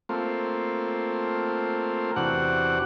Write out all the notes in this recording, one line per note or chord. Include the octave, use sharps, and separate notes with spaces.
A3 A#3 C4 F4
E2 C3 D4 F#4 F#5